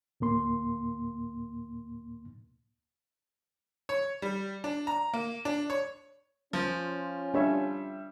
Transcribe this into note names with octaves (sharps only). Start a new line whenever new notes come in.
D2 A2 A#3 C6
C#5
G3
D4
A#5
A#3
D4
C#5
F3 C#4 F4
G3 D4 C#5 E5